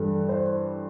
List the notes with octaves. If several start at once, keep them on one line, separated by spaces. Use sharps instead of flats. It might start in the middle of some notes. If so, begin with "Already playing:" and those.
Already playing: G2 E3 A4
C5